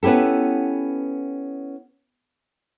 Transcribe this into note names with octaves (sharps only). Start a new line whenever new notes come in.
B3 C#4 E4 G4 A4